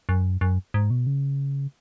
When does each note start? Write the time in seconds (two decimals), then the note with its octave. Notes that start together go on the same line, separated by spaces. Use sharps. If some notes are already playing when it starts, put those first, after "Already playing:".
0.09 F#2
0.41 F#2
0.74 G#2
0.90 B2
1.07 C#3